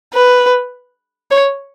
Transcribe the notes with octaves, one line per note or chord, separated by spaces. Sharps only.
B4
C#5